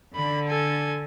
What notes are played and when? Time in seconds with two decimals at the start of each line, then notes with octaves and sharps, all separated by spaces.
0.16 D3 B5
0.49 A4 G#5